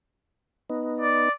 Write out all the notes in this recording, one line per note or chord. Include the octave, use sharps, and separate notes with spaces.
B3 D#4
D5